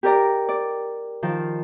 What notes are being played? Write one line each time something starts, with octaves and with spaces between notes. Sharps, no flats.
G4 A#4 D5 A#5
D5
D#3 F3